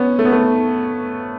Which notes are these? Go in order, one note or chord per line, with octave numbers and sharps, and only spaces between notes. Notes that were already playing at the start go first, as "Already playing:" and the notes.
Already playing: B3 C#4
A3
B3
A3